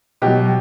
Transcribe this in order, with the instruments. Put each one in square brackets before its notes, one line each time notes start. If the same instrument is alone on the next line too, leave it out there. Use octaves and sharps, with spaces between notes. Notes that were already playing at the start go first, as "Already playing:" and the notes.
[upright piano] B2 F#3 G4